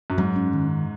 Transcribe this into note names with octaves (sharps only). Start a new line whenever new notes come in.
F#2
G#2 F#3
C#4
D#3